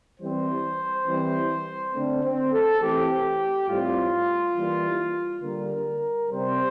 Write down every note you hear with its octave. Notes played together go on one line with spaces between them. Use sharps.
E3 G3 C4 C5
E3 G3 C4
D3 A3 C4 D4
C4
A4
E3 A3 C4 G4
A2 G3 C4 F4
E3 G3 A#3
D3 G3 A#3 A#4
C3 G3 C4 C5